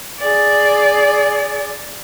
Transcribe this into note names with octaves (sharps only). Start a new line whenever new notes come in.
G#4 D5